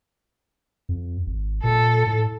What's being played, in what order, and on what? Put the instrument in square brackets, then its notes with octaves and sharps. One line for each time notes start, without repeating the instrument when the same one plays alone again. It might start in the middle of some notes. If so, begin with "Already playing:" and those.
[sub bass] F2
G#1
[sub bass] A#2 [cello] A4
[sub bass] A2